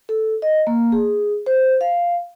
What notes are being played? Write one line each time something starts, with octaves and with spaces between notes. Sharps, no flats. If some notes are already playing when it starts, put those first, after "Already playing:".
A4
D#5
A#3
G#4
C5
F5